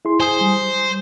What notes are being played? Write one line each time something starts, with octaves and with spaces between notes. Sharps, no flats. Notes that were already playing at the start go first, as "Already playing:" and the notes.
E4 G#4 C6
C5 G#5 D#6
G3